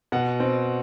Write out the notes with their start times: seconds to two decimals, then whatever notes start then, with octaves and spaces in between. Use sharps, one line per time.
0.12 B2 F#5
0.40 C4